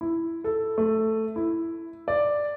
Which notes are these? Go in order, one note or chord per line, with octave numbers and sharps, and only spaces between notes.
E4
A4
A3
E4
D5